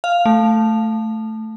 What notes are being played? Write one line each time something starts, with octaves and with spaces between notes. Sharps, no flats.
F5
A3